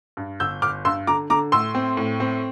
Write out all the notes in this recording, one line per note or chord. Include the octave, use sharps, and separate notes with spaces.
G2
G1 E6 G6
G1 D6 F6
G2 C6 E6
D3 A#5 D6
D3 A#5 D6
A2 C6 E6
C4
A2
C4